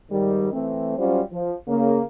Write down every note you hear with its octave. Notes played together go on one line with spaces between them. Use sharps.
G#2 D#3 G3
E3 A3 C4
F#3 G3 C#4 F4 C5
F3
C#3 A#3